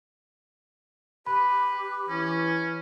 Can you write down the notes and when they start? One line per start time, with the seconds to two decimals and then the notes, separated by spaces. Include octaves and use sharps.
1.26 G4 B4 B5
2.09 E3 C#4